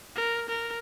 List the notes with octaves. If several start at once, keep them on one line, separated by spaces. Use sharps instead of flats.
A#4
A#4